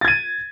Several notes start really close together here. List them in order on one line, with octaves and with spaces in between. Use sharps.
A6 G#6 D#7